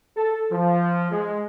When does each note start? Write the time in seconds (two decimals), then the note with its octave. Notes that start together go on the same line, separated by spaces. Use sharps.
0.17 A4
0.52 F3
1.12 G#3